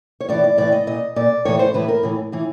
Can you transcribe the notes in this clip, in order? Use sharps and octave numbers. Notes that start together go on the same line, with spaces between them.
C#5
A2 E3 D5
D5
A2 E3 D5
D#5
A#2 D#5
A#2 D5
A2 E3 C#5
C5
A2 E3 B4
A#4
A2 E3
A2 E3